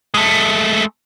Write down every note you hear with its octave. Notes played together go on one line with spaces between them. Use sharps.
G#3 A3